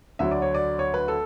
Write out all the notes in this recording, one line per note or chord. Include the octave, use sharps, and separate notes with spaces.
D2 D3 F#3 E5
D5
C#5
D5
C#5
B4
A4